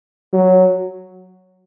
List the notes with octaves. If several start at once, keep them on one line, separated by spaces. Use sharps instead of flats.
F#3